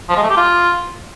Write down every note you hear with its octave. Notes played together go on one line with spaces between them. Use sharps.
F3
G#3
A3
G4
F4